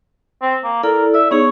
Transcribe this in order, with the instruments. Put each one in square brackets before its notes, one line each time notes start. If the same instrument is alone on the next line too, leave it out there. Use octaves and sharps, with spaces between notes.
[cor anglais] C4
A#3
[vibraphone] E4 A4 D5 [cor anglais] A#4
[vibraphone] D5 [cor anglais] E5
[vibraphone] B3 D#4 G#4 [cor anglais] C#5